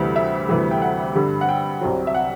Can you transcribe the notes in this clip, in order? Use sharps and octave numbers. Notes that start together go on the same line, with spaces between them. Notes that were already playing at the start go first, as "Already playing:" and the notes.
Already playing: D2 C3 E3 G3
E5
D2 C3 E3 G3
G5
F#5
G2 D3 G3
F#5
G5
C2 C3 F#3
E5
F#5